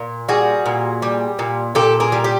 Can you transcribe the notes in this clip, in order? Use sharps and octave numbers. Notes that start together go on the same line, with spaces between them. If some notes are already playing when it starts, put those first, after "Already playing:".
Already playing: A#2
G3 F#4 G#4
A#2
G3
A#2
A#2 G4 A4
G#4 A#4
G3
G4